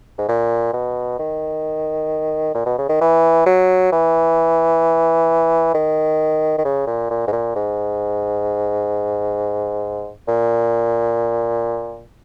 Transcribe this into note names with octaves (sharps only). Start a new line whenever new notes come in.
G#2
A#2
B2
D#3
A#2
B2
C#3
D#3
E3
F#3
E3
D#3
D#3
C#3
A#2
A#2
G#2
A#2
G#2
A#2